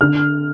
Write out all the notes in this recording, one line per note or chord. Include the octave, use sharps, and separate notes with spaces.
D3 F6